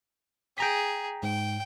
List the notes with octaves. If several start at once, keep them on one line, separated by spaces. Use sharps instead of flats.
G#4 G5 A#5 B6
G#2 G5